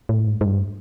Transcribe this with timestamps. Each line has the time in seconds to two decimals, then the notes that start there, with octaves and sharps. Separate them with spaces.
0.09 A2
0.27 G#2
0.41 G#2
0.46 G2